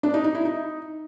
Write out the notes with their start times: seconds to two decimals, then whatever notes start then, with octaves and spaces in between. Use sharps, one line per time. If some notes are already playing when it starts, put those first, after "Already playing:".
0.03 D4
0.14 D#4
0.24 D#4
0.35 E4
0.45 D#4